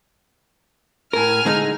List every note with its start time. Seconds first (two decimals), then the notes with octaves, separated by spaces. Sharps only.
1.13 A2 A#4 G#5 F6
1.45 D3 G#3 D#4